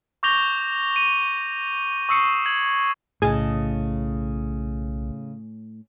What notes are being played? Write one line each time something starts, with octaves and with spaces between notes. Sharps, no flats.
C#6 D6 G6 A#6 F7 G7
D#7
C#6 D#6 E6 C7 C#7
G#6 F#7
B1 A2 C#3 G#4 D#5 G#5 A5